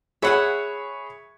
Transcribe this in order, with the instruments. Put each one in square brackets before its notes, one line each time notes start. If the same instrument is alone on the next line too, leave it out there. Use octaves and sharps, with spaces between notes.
[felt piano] G#4 C#5 B5 [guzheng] E5 F#5 G#5